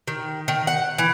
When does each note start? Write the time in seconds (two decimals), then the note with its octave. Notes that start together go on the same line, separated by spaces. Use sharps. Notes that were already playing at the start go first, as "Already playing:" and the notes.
0.07 D#3
0.48 D#3
0.67 F#5
0.98 E3